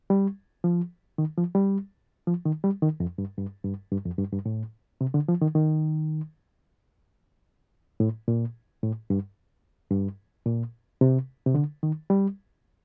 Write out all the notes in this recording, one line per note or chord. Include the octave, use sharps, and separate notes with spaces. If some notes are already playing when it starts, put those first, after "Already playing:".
G3
F3
D#3
F3
G3
F3
D#3
G3
D#3
F2
G2
G2
G2
G2
F2
G2
G2
A2
C3
D3
F3
D#3
D#3
A2
A#2
A2
G2
G2
A#2
C3
C3
D3
D#3
G3